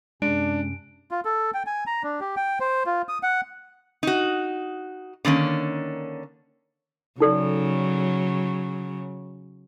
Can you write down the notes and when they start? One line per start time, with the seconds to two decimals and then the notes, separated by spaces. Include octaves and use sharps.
0.22 F#2 C3 G#3 C#4 D4 D7
1.11 F4
1.25 A4
1.54 G5
1.66 G#5
1.87 A#5
2.03 D4
2.20 G4
2.37 G5
2.60 C5
2.86 F4
3.09 D#6
3.23 F#5
4.03 D#4 F#4
5.25 D3 D#3 A#3 C#4
7.20 C#3 F#3 D#4 A4 D5